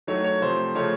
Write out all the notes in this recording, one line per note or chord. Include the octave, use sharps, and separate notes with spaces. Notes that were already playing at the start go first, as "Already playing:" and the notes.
D#3 F#3 A3 C#5
C#5
C3 F3 A3 C5
C#3 F3 A3 C#5